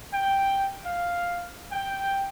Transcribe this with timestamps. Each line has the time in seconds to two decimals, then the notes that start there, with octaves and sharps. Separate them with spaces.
0.13 G5
0.85 F5
1.72 G5